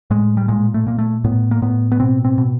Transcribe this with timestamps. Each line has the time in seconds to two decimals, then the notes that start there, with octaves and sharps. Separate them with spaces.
0.10 A2 G#3
0.37 G3
0.48 A#2 G#3
0.74 A3
0.87 A#2 A#3
0.98 A3
1.24 A2 B3
1.51 A#3
1.62 A2 B3
1.92 B3
2.00 B2 C4
2.25 C4
2.38 B2